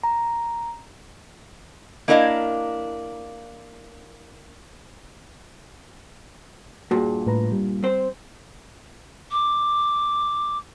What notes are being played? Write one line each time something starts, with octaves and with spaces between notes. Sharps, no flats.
A#5
A#3 D4 E4 A#4 D#5 F5
G2 A#2 F#4 G#4
A2 B4 A#5
G3
C4 C5
D6